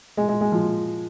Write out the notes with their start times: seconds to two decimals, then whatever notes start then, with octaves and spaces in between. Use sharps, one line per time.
0.17 G#3
0.29 G#3
0.41 G#3
0.52 F3